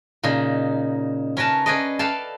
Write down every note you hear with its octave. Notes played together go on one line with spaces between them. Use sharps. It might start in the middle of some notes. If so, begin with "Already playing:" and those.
A#2 C#3 D#4
C#4 A#4 B4 A5
C#4 G#4 B4 D5 D#5
A4 B4 D5 F5 G5 A5